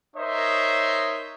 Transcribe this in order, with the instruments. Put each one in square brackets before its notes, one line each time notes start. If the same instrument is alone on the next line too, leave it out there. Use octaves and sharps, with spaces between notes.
[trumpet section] D#4 A#4 C5 C#5 D#5 E5